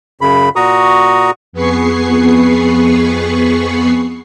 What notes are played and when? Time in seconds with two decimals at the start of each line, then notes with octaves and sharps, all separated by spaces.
0.21 F#2 C#3 B5
0.56 A#2 F#4 A#5 C#6 D#6
1.53 F2 B3 G#4 B4 C#6 C7